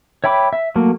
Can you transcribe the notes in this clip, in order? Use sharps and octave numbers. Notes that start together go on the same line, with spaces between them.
C#5 E5 G5 B5 D6
E5
F#3 A3 A#3